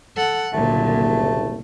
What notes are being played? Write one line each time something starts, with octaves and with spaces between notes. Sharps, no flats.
A4 F#5
F#1 C2 A#2 D3 A3